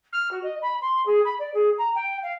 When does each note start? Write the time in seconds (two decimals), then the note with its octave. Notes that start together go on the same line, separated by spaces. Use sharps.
0.13 F6
0.31 F#4
0.43 D#5
0.62 B5
0.81 C6
1.06 G#4
1.25 B5
1.39 D5
1.54 G#4
1.78 A#5
1.95 G5
2.23 F5